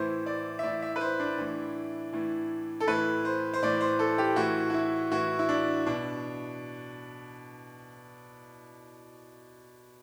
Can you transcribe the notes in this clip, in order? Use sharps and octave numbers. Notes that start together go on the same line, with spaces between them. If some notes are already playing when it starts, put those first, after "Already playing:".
Already playing: A2 E3 C5
D5
E5
A2 E3 D5
E5
B4
C5
D4
A2 E3
A2 E3
A4
A2 E3 B4
C5
C5
A2 E3 D5
C5
A4
G4
A2 E3 F#4
F#4
E4
A2 E3 F#4
E4
D4
B2 D4